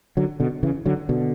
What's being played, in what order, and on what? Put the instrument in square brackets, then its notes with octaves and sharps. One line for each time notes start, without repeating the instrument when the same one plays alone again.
[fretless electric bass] D3 F#3
B2 D3
C#3 E3
D3 F#3
B2 D3